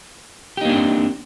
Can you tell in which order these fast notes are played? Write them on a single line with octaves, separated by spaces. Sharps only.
G4 D#4 A#3 D4 C4